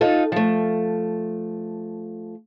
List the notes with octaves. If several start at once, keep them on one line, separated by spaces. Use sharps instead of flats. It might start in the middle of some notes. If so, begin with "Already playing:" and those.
D#4 F4 A4
F3 A3